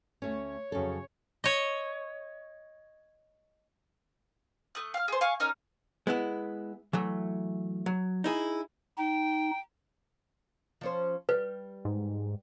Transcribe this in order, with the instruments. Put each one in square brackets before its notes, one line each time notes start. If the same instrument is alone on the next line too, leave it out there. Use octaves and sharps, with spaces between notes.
[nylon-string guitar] D2 A3 C#4 [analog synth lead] C#5
[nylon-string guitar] F2 A4 [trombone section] C#3 F#3 C#4
[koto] C#5 D#5
[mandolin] A3 D#6 F#6
F5 F6
G#4 C5
F5 G#5 C#6
C#4 D#4 A#4
[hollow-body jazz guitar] G#3 B3 E4
E3 F#3 A3
F#3
D#4 E4 G#4
[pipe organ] D#4 [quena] G5
[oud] F3 C#4 C5
[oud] G3 [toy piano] B4
[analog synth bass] G#2